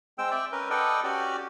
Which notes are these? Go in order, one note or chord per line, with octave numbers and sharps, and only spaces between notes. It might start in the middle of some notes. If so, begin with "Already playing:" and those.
G#3 C4 G5 E6
D5 E5 G5
C#4 A#4 B4
A4 B4 D5 D#5 F#5 G5
C#4 F#4 G4 D5